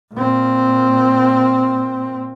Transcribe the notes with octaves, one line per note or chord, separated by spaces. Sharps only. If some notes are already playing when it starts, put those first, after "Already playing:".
A#2 C4